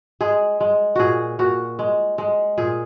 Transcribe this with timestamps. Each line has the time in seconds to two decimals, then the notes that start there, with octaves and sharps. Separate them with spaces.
0.21 G#3 G#4
0.60 G#3
0.96 A#2 F#4 G#4
1.39 A#2 F#4
1.79 G#3
2.18 G#3
2.58 A#2 G#4